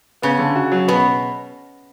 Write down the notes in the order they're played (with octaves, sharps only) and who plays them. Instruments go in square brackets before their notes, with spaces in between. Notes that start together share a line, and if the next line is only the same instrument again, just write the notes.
[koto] C#3 [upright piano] B3
[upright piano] D3
F#4
F#3
[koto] B2 [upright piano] B3